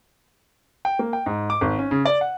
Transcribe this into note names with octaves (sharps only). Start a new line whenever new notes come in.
G5
A#3
G5
G#2
D6
G#1
C#4
C#3
D5
F#5